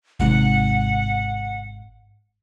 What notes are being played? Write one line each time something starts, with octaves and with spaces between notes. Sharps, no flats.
G#1 G#2 C3 F#5